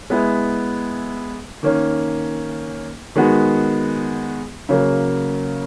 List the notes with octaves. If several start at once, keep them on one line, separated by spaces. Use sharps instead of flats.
G#3 B3 E4
D#3 A#3 C#4
D#3 G#3 B3 F#4
C#3 F#3 A#3